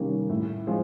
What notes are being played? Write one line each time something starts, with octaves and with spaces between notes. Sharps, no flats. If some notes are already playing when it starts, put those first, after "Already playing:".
Already playing: C3 D#3 G3 A#3 C#4
A2
F3 G#3 C4 F4